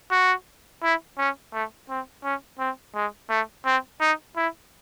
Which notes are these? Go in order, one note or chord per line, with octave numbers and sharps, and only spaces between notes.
F#4
E4
C#4
A3
C4
C#4
C4
G#3
A3
C4
D#4
E4